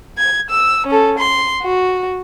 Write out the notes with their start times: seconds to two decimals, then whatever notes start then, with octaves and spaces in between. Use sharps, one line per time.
0.18 G#6
0.50 E6
0.87 C#4 A4
1.19 C6
1.63 F#4